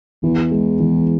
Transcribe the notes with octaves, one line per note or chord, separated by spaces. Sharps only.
E2 E3
G#3
E3